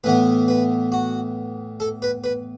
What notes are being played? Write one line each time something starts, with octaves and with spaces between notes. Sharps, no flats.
A2 E3 B3 B4
B4
F#4
A4
B4
B4